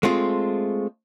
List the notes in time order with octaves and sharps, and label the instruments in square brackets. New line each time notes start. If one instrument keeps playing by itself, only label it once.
[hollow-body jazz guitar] G#3 A3 C4 F4